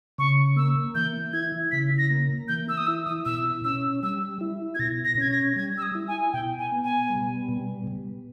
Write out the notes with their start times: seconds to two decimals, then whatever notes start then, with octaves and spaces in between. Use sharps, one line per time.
0.18 C#3 C#6
0.56 A#3 E6
0.95 E3 G6
1.33 E4 G#6
1.71 C#3 B6
1.98 A#6
2.10 A#3
2.48 E3 G6
2.69 E6
2.77 D#6
2.87 E4 E6
3.06 D#6
3.25 B2 E6
3.64 C#4 E6
4.03 G3 E6
4.41 E4
4.75 G#6
4.79 B2 A#6
5.05 A#6
5.18 C#4 G#6
5.31 A#6
5.56 G3 G#6
5.78 E6
5.82 D#6
5.95 E4
6.08 G#5
6.33 B2 G5
6.58 G#5
6.72 B3
6.84 G#5
7.10 G3
7.48 B2
7.87 B2